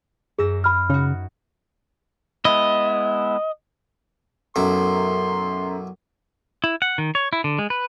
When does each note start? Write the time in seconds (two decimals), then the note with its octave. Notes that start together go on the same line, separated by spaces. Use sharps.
0.39 F#2 G#4 E6 A#6
0.64 B5 F6
0.90 C#3 D#4 F#4
2.45 G#3 B3 E4 D#5
4.56 B1 F#2 E4 A4 A#4 C6
6.64 E4
6.82 F#5
6.98 D#3
7.15 C#5
7.33 E4
7.44 D3
7.59 G#3
7.70 B4